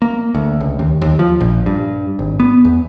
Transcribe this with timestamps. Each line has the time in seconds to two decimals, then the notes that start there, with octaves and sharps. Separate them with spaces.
0.02 A#3
0.35 D2
0.60 C#2
0.79 D#2
1.01 D#2
1.19 F3
1.40 A#1
1.66 G2
2.19 G#1
2.40 B3
2.65 E2